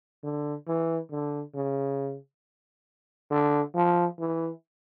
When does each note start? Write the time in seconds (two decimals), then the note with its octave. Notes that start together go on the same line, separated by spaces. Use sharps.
0.24 D3
0.67 E3
1.11 D3
1.55 C#3
3.31 D3
3.75 F3
4.19 E3